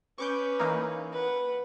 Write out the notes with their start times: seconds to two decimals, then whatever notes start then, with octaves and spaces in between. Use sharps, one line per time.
0.18 C#4 B4 C#6 D6 G6
0.59 E3 A#3 D#4
1.12 B4 F#5